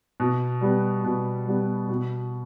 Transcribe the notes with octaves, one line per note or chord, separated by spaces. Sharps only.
B2
G3 B3
B2
G3 B3
B2